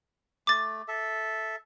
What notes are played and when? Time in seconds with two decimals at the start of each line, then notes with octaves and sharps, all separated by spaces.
0.47 A3 D6 A6
0.88 A4 E5